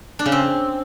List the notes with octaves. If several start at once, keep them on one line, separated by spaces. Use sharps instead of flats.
D4
C#3
C4